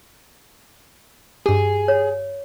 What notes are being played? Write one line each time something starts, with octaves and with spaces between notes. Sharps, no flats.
G2 G4 G#4
C#5